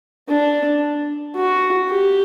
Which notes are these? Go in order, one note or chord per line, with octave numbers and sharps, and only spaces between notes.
D4
F#4
G4